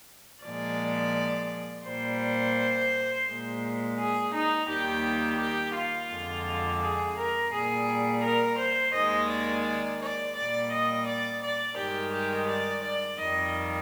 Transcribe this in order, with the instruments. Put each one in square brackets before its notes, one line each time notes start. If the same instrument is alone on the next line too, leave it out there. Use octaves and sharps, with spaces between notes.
[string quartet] A#2 F3 G#3 D5
A#2 G3 C5
A#2 G#3
G#4
D#4
D#2 D#3 G3 G4
G4
F4
F2 D3 G#3
G#4
A#4
A#2 G3 G#4
A#4
C5
D#2 D#3 G#3 D#5
D5
D5
D5
A#2 G3 D5
D#5
D5
D5
G2 D#3 G#3 G4
G4
D5
D5
F2 D#3 G3 D#5